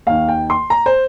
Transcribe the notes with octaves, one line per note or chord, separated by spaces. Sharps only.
D#2 D#3 F5
G5
C6
A#5
C5